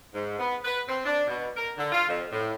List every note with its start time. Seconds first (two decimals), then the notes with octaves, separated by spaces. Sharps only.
0.14 G#2
0.39 B3
0.65 B4
0.89 C4
1.05 D4
1.27 B2
1.57 A#4
1.78 D3
1.92 F4
2.09 F2
2.32 A2